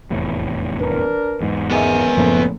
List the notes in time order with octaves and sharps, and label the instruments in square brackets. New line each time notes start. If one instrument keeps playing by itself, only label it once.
[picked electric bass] F1 E2 A2
[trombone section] D4 A#4 [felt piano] B4
[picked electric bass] E2 G#2
[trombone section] G#1 C#3 A#4 [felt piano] G#3 D#5 E5 [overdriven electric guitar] B3 G#5
[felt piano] F#1 A2 [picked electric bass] F3 A3